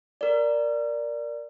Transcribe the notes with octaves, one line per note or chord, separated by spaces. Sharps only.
A#4 D5